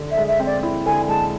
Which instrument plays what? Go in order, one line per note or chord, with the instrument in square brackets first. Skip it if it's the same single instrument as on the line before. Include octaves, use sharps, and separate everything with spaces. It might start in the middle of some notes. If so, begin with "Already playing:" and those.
Already playing: [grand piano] D3
[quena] E5
[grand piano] G#3
[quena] E5
[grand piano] C4
[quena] D5
[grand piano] E4
[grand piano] D3 [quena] G#5
[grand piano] G#3 [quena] A5